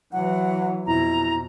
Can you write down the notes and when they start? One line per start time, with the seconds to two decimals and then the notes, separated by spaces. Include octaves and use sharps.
0.13 E3 F#3 F#5
0.86 F2 B2 E4 A#5